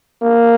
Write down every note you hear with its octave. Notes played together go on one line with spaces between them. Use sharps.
A#3